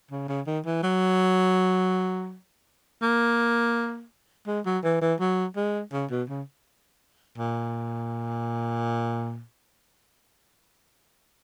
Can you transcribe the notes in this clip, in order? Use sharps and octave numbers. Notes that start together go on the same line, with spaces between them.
C#3
C#3
D#3
E3
F#3
A#3
G#3
F#3
E3
E3
F#3
G#3
C#3
B2
C#3
A#2